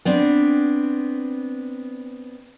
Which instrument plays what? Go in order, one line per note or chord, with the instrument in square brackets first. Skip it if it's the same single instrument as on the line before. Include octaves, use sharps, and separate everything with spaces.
[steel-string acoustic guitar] B3 C4 D4